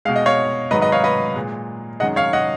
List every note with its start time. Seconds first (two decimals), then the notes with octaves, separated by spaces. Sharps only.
0.05 B2 G#3 F5
0.16 D#5
0.26 C#5 F5
0.71 G#2 D#3 F#3 B4 D#5
0.81 B4 D#5
0.92 C#5 F5
1.04 B4 D#5
1.36 A#2 G#3
2.00 F#2 D#3 G#3 D#5 F#5
2.16 C#5 F5
2.33 D#5 F#5